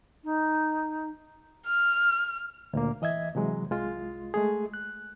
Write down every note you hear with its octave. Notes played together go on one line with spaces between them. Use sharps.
D#4
F6
D2 A#2 A#3
E3 D#5 E5 G#6
C3 E3 F#3 G#3
C2 G#3 F4
G#3 A3 G#4
F#6